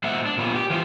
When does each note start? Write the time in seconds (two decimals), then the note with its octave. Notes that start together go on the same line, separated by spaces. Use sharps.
0.04 A#2 G#3 C5 E5 F#5
0.26 D4
0.38 A#2 F3 B3 C#4
0.55 G4
0.70 E3 F4 C5